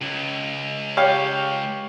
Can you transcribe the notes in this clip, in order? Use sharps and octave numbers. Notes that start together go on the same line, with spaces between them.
C#2
G4 C#5 F5